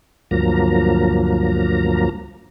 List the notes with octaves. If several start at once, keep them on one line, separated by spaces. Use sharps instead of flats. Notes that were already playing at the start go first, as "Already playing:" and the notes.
D2 G2 F3 F#3 A#3 A#5